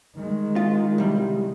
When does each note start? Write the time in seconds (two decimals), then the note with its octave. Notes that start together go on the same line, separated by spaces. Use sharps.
0.15 D#3 G#3
0.56 F4
0.98 C2 G3